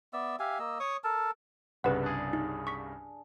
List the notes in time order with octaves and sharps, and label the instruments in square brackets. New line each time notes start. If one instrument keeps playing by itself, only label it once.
[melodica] B3 D5 E5 E6
G4 E5 F5 G#5
A#3 D#5 E6
C#5 C#6 D#6
A4 A#4 A5
[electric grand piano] C2 G2 C#3 [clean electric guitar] B3 [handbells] B4 F#5
[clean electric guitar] D4 G#4
[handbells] D#4
C#6 B6